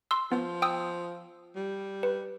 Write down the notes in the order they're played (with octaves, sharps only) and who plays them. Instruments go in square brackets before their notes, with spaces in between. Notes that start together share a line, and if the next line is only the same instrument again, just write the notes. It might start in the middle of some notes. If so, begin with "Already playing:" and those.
[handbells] C6 E6
[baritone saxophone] F3 [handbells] B3
[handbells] G5 D#6 E6
[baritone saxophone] G3
[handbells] B4